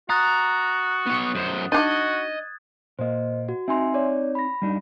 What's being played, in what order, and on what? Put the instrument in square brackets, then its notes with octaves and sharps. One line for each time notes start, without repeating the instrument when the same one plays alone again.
[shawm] F#4 [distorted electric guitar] A#5 [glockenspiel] D#6 F#6 A6
[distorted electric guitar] B3 C#5
F#2 C5
[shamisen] D4 D#4 [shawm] F#4 [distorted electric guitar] D#5 [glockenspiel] G#6 A6
[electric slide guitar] A#2 A#3 [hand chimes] C5 D#5
[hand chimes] F#4
[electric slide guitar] C4 D#4 A#5 [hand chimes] E5 G#5 C6
[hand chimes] C#5 D5
B5 A#6
[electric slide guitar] G3 D4 D#4